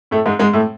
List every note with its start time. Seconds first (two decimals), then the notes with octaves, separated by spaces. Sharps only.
0.11 A2 A3
0.26 G#2 G#3
0.39 G#2 G#3
0.53 A2 A3